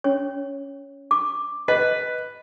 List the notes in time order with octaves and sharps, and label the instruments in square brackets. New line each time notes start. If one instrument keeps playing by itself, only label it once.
[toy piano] C#4 C#5
D6
[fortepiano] B4 [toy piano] D#5